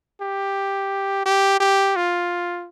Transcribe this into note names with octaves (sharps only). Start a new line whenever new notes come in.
G4
G4
G4
F4